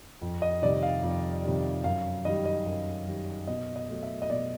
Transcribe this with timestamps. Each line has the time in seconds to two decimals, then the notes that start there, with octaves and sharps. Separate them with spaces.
0.22 F2
0.42 D#5
0.62 C3 D#3 G3 D5
0.83 F5
1.03 F2
1.44 C3 D#3 G3
1.84 F#2 F5
2.25 D#3 G3 D#5
2.46 D#5
2.66 F#2
3.08 D#3 G3
3.47 B2 D#5
3.76 D#5
3.89 F#3 A3
4.03 E5
4.22 D#5
4.30 B2 D5